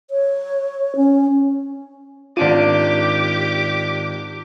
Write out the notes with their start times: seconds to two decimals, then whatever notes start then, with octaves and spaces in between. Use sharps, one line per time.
0.10 C#5
0.96 C#4
2.37 G#1 D4 F4 G4 D6 D#7